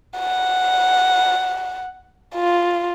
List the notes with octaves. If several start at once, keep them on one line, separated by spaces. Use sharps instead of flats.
F#5
F4